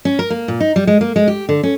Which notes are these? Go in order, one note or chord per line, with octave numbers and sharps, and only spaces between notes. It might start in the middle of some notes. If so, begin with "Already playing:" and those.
C#4
A#4
A#3
A#2
D#4
G3
G#3
A#3
G#3
G4
D3
C#4